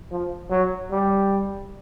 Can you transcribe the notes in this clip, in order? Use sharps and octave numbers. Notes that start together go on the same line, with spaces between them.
F3
F#3
G3